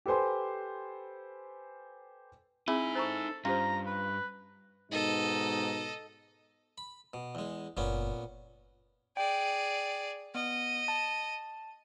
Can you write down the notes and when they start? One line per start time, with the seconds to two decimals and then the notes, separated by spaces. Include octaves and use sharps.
0.06 G4 A4 B4 C5 G#5 C6
2.68 C4 D#4 E4 G#4 G#5
2.95 A4 C5 A#5 C#6
3.45 G2 C#4 F4 G4 C5 A#5
3.86 B4
4.91 G#2 B2 D#4 A4 D#5
6.78 B5
7.13 B2
7.35 E2 G#3
7.77 F#1 E2 A#2 B3 C#4
9.17 G#4 D5 G5
10.35 B3 D#5
10.88 A5